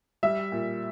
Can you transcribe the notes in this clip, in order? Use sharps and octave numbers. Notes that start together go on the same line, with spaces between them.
G3 E5
A#2